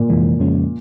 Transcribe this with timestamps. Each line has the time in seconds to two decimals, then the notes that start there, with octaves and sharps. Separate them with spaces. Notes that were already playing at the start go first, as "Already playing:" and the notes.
Already playing: A#2
0.09 F2 C3 E3 G#3
0.39 F2 C#3 F3 G#3 C#4